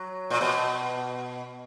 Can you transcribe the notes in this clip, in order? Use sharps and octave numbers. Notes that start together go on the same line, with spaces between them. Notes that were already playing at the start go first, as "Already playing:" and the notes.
Already playing: F#3
A#2
B2